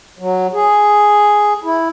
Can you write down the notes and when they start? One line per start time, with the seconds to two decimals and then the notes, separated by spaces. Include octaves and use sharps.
0.19 F#3
0.53 G#4
1.64 E4